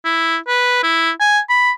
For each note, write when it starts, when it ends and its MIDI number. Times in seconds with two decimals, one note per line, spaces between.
0.05 0.37 64
0.48 0.81 71
0.83 1.10 64
1.20 1.39 80
1.49 1.71 83